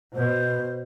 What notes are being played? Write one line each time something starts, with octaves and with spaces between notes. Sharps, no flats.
B2 C5